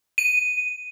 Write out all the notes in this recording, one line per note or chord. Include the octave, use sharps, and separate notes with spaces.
D#7